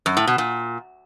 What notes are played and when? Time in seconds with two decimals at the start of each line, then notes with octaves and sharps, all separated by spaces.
0.06 F#2
0.17 A2
0.27 B2
0.38 A#2